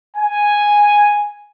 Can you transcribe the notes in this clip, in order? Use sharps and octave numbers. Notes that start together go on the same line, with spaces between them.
G#5